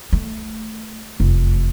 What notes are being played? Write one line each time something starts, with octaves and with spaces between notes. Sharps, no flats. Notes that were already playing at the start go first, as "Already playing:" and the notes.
A3
F1 E2